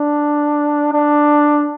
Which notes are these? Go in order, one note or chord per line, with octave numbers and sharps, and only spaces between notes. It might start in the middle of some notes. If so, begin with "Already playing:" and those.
Already playing: D4
D4